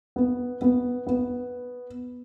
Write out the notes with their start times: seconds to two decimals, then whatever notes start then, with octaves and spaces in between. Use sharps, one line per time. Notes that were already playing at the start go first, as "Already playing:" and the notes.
0.16 B3
0.62 B3
1.07 B3